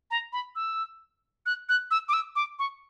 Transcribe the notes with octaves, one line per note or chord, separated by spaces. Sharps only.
A#5
B5
E6
F#6
F#6
E6
D6
E6
D6
C#6